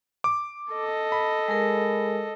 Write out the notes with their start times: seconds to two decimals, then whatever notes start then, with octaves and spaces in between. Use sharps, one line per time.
0.24 D6
0.72 A4 D#5
1.12 B5
1.48 G#3 G#4 A#4